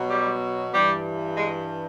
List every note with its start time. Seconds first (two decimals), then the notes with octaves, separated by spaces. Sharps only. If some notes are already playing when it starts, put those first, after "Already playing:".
Already playing: B2 F#3
0.10 G3
0.74 G2 E3 G3
1.37 G#3